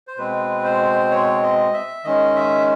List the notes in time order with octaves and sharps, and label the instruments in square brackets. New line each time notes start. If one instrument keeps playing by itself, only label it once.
[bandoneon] C5
B2 G#3 C4 B4
C5
C#5
D#5
E5
D#3 G#3 C#4 D#5
E5